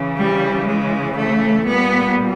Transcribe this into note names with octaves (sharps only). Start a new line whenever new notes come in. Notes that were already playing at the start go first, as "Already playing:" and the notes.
Already playing: C#3 E3
G3
G#3
A3
A#2 G3 B3